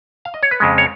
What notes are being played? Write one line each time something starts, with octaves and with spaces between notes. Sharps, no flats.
F5
D#5
C#5
B4
F2 C#3 G#3
C#5